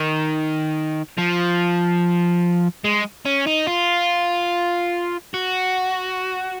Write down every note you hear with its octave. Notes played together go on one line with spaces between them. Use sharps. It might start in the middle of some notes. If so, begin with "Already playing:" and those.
Already playing: D#3
F3
G#3
C#4
D#4
F4
F#4